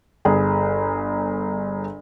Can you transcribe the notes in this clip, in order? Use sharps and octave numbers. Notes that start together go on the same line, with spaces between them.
G1 G#4